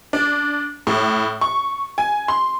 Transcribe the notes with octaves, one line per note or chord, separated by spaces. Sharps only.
D4
A2
C#6
G#5
C6